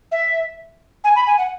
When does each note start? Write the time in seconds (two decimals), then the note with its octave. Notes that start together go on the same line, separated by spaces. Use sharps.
0.12 E5
1.04 G#5
1.16 B5
1.27 G#5
1.38 F#5